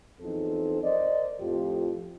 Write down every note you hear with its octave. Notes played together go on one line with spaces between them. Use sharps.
E2 F3 C4 D#4 A4
A#4 C5 D5 D#5
F2 A2 F3 F4 G4